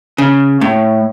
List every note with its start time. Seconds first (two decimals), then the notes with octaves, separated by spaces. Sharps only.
0.18 C#3
0.61 A2